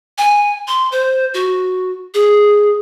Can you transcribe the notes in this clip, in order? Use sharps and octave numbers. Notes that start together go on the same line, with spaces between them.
G#5
C6
C5
F#4
G#4